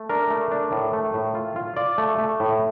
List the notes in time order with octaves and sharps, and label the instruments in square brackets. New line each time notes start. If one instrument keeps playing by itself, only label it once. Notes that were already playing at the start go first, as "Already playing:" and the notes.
Already playing: [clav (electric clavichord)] A3
D4 A#4
A3
D4
A2
A3
A2
F4
F4
F4 D5
A3
A3
A2